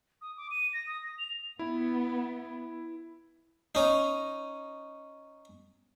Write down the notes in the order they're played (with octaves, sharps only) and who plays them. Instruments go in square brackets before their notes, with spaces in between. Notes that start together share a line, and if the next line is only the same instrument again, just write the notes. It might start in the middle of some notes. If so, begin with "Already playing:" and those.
[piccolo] D#6
D6
D#7
A#6
D#6
A#6
F7
[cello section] B3 [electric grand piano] E4
[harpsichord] C#4 D#4